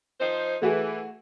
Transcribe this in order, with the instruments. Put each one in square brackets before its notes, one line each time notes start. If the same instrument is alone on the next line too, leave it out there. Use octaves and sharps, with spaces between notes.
[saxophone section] F3 D#4 C5
[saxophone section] E3 [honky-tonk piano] A3 F#4 G#4